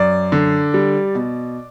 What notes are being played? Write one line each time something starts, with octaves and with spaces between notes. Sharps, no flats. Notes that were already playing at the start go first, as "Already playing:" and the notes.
Already playing: F#2 D5
D3
G3
B2